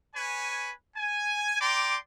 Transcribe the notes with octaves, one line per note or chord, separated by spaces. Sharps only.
B4 C#5 G#5
G#5
D5 G5 A#5 C6 D6